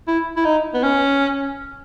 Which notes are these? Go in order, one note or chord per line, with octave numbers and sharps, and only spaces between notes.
E4
E4
D#4
B3
C#4